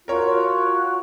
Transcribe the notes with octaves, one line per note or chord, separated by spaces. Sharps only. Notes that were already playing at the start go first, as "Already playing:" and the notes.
F4 F#4 A#4 C#5